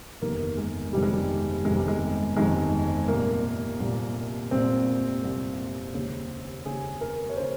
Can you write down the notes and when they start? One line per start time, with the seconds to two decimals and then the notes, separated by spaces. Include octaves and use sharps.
0.22 G1 F2 C3 D#3 A#3
0.57 G#3
0.93 G1 F2 C3 D#3 G3
1.03 G#3
1.12 G3
1.65 G1 F2 C3 D#3 G#3
1.77 G3
1.88 G#3
2.36 G1 F2 C3 D#3 G#3
3.08 C2 A#2 A#3
3.80 C2 A#2
4.51 C2 A#2 C4
5.23 C2 A#2
5.94 D#2 C#3
6.66 D#2 C#3 G#4
7.01 A#4
7.30 C#5
7.37 C#3 C5